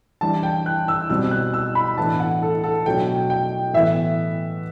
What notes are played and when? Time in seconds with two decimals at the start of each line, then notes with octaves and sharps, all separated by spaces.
0.21 E3 G3 D4 A5
0.43 G5
0.66 F#6
0.88 E6
1.10 B2 G3 C4 E6
1.31 F#6
1.54 E6
1.75 B5
1.97 A2 E3 B3 D4 A5
2.20 F#5
2.42 A4
2.64 A4
2.86 B2 F#3 A3 D4 G5
3.30 G5
3.73 A2 E3 B3 E5